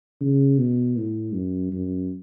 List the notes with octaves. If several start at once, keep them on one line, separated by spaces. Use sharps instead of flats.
C#3
B2
A2
F#2
F#2